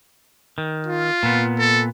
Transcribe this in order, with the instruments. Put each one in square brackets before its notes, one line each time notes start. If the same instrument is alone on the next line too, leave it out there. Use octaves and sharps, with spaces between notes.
[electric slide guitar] D#3
[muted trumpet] F4
[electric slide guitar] A#2 B3
[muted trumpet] A4